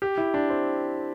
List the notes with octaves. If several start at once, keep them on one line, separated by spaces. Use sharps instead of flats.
G4
E4
D4
C4